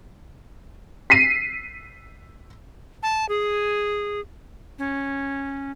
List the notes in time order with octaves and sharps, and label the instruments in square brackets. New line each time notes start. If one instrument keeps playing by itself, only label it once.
[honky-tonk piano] B6 C7 D#7
[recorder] A5
G#4
C#4